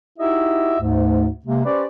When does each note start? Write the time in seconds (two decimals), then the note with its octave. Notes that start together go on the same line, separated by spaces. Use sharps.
0.18 D#4 E4 F#4 G4 D#5 E5
0.80 D2 G#2
1.45 C3 G#3 A#3
1.64 C#4 G4 B4 C5 D5